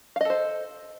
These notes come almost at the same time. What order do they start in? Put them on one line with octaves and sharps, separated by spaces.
F5 D#5 A4 C5